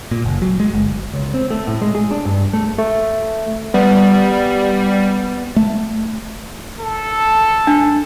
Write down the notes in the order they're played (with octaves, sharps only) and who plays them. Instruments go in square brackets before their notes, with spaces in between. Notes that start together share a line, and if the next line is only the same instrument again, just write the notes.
[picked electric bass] A#2
F#1
F#3
G#3
G1
[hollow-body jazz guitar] C#2
C4
A3
A2
G#3
G#4
D4
G2
A3
[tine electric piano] A3
[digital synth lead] G3 [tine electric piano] B3
[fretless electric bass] A3
[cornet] A4
[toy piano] D4